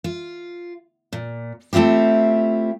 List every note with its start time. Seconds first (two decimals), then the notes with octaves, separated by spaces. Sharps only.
0.04 F4
1.13 A#2
1.73 A3 C4 E4 F4 G4